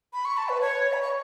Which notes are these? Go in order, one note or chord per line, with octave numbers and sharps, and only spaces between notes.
B5
C#6
A5
B4
C#5
B5
C#6